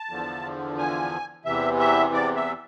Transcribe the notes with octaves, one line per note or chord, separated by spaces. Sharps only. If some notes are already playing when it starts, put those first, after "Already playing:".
Already playing: A5
E2 D3 F3
G#5
E2 C3 E3 E5
E5
D5
E5